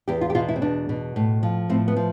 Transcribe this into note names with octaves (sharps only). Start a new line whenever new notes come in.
E2 G4
F4
G4
B2 F4
E4
C4
E2 D4
B2
A2
F3
A2 C4
B3
F3